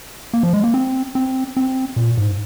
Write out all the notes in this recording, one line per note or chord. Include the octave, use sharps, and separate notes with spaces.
A#3
F3
G#3
A#3
C4
C4
C4
A#2
G#2